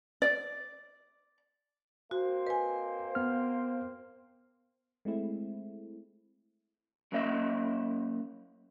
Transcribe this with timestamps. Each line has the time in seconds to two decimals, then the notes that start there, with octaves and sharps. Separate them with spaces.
0.22 D5
2.11 A#3 C4 F#4 C5
2.47 B4 D#5 G#5
3.15 B3 F6
5.05 G#3 A3 C4 E4
7.12 F#3 A#3 C#4 D#5 E5